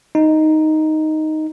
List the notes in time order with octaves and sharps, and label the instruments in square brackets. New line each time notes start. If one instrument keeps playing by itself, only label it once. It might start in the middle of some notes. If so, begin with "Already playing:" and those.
[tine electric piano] D#4